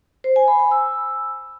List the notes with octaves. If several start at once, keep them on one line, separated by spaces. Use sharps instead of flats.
C5
G#5
B5
G#5
E6